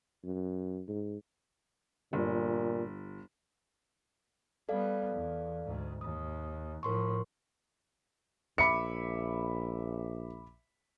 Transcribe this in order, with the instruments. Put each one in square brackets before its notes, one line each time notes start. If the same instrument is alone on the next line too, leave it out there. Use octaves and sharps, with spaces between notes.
[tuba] F#2
G#2
[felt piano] G1 [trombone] A#2
[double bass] G3 B3 [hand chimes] A4 D5 F5
[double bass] E2
D2 G#2
[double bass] D#2 [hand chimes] D#6
[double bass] A2 F3 [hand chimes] A#4 C6 C#6
[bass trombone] A#1 [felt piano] E5 B5 D6 [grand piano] C#7